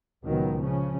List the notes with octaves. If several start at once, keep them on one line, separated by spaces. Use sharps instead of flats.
C#2 A#2 D#3 F#3 B3
C#3 F3 C#4